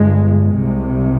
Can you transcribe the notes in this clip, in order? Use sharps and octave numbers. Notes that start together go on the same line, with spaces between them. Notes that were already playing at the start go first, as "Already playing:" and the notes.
Already playing: G1 G2 G#3
C2 C3